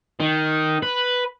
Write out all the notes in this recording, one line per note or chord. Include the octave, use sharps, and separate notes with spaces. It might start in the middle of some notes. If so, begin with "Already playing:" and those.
D#3
B4